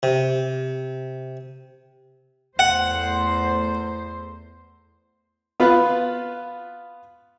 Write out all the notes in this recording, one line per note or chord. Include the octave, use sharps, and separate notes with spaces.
C3
E2 A3 C5 F#5
B3 F4 B4